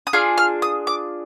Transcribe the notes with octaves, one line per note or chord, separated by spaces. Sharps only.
D#6
D4 F4 G#4 F6
F6
D#6
D6